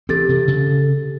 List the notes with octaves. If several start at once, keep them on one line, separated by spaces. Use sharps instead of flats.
E3 C4 G4 A4 A6
C3
C#3